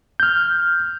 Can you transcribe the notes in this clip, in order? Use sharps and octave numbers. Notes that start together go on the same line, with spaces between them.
F6 G6